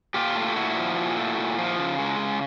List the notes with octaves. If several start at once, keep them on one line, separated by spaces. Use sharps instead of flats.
A#2 F4 G4
A3
G4
A#2 E4 F#4
F3
A#2
A3
A#2
F3
C#3
G#3
C#3